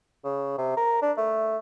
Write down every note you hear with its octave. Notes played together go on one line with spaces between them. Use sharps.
C#3
C3
A#4
D4
A3